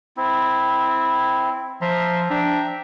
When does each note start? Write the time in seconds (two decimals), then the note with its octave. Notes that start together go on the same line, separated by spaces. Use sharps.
0.17 C4 E4
1.81 F3 E5 A#5 C6
2.30 D4 E5 G5 A#5